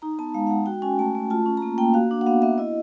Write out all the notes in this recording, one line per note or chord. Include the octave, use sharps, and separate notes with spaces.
D#4 A#5
B3 A5
G#3 F5
F5
G#3 F#5
F#4 G5
C#4 G#5
A3 A5
A3
F4 A5
C#4
A#5
A#3 A5
A#3 G5
F#4 F5
D4
F#5
B3 F5
B3 E5
E4 D#5